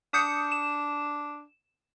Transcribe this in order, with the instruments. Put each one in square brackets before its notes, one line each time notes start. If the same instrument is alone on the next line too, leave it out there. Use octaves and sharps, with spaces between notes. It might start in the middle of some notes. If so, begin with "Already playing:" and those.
[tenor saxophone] D4 [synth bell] D#6 G6 C#7
[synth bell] E7